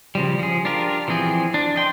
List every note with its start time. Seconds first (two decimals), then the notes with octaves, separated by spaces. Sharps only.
0.15 C#3 F3 G3
0.39 F3 G#4
0.65 D4 F4 G4 A#4
1.08 E3 F3 C4 G#4
1.54 D4
1.76 D#5 G5 C6